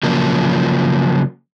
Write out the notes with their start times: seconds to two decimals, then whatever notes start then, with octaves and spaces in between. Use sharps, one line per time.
0.03 C#3 F3 F#3 A#3